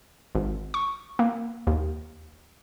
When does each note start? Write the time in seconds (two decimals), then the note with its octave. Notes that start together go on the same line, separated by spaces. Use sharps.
0.35 G#1
0.74 C#6
1.19 A#3
1.67 D#2